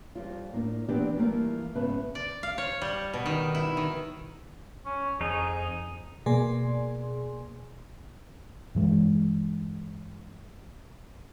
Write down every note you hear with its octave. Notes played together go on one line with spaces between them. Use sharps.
F2 G3 F4
A2 A#3 D4
E3 B3 C4 D4 G4 D5
E3 F3 G3 A3 A#3
G#2 C#3 B3 B4 E5 A5
D5
F5
C#5
G3
B2
D#3
E4
D#3
C#4
F2 D#4 G#4
B2 A#3 G#4 D5 G#5 C6
G2 E3 G#3